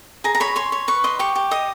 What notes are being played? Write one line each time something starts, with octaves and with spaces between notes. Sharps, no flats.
G#4 A#5
A#5
C#5 B5
C#5 C6
C#5
B4 C#6
D#5 C6
G4 C#6
G4
D#5 D#6